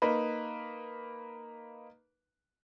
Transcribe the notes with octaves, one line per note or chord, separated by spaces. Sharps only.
A#3 D#4 B4